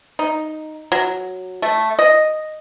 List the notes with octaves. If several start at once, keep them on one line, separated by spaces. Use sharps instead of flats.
D#4
F#3
A3
D#5